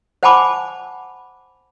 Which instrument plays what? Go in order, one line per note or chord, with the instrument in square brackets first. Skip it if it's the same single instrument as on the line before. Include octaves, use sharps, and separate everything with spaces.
[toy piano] C5 F#5 G#5 A5 B5 D6